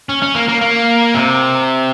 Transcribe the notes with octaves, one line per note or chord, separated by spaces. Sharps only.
C#4
C#4
A#3
A#3
A#3
C3